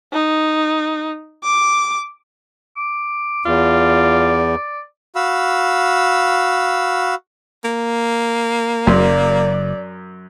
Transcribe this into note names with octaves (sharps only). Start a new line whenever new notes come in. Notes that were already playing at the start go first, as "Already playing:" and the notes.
D#4
D6
D6
E2 F4 D5
F#4 F5 B5 E6
A#3
F#1 F#2 D5 C6